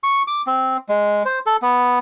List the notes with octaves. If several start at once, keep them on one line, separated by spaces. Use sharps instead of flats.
C#6
D6
C4
G#3
C5
A4
B3